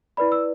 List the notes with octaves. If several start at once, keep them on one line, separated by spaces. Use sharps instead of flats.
E4 B4 D5 B5
E6